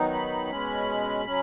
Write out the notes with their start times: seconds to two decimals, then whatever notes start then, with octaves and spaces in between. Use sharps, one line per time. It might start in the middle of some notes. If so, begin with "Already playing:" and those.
Already playing: D#3 F#3 B3 D#4
0.13 B5
0.50 B2 G#3 C#4
1.26 F#3 C#4